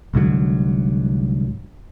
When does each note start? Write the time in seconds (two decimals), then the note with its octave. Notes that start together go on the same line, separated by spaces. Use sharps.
0.14 C2 G#2 D3 F#3